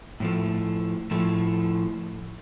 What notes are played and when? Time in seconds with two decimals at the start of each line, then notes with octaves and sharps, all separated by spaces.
0.20 A2 F3 A3
1.11 A2 F3 A3